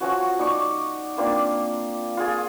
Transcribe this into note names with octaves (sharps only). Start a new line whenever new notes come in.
F3 C#4 F#4
D#4 D5 C#6 D6
A#3 C4 D4 F4
F4 G#4